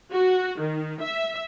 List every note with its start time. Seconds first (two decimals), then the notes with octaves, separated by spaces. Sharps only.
0.12 F#4
0.60 D#3
1.02 E5